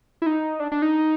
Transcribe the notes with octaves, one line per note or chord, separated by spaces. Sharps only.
E4
D#4
D4
D4
D#4